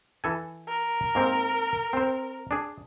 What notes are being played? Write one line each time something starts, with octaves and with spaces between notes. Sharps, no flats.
E3 A4 G#5
A#4
G#2 A#3 C4
C4 C5
D4 G#4